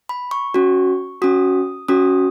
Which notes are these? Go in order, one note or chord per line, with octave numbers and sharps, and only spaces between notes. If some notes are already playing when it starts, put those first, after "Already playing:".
B5
C#6
C#4 F#4
C#4 F#4 D#6
C#4 F#4 D#6